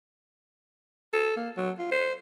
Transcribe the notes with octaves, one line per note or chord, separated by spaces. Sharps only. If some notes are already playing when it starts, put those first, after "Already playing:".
A4
A#3
F#3
F4
C5